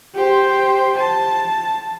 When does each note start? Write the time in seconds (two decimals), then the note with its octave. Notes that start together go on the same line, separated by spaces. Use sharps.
0.15 G4 C5
0.97 A5